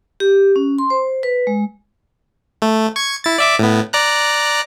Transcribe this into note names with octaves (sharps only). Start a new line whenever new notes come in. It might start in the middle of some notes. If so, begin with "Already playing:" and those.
G4
C#4
C6
C5
B4
G#3
A3
C#6 G#6
E4 A6
D5 E5 D6
A2 B3
D5 A#5 F#6